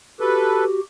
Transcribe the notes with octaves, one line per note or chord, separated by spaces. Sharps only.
F#4 G4 A4 B4